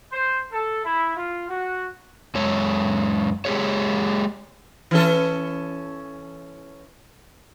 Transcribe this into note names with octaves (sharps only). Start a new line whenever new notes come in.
C5
A4
E4
F4
F#4
F#2 G#3 C#5
G#3 G4 G#4 C#5
E3 C#4 A4